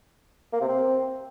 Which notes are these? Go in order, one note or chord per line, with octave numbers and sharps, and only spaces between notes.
A#3
C3
C4